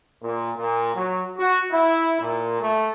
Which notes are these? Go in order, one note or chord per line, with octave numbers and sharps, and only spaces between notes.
A#2
A#2
F#3
F#4
E4
A#2
A3